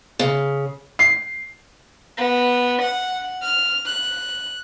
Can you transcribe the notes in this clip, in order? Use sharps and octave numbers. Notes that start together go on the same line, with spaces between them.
C#3
C7
B3
F#5
F6
F#6